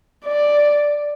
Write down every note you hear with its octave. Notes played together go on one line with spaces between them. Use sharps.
D5